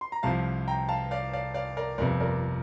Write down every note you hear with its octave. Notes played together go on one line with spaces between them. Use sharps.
C6
A#5
C2 C3 F3 F5 A5
G5 A#5
F5 A5
D5 F5
D5 F5
D5 F5
A#4 D5
G1 F2 C3 A#4 D5
A#4 D5